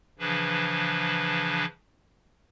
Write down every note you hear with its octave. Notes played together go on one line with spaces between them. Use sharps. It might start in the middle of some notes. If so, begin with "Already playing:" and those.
C#3 E3 F3 D4 B4